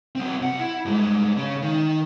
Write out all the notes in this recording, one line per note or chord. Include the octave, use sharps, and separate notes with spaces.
F#3 C4
C2 F#5
E4
G2 G#3
C#3
D#3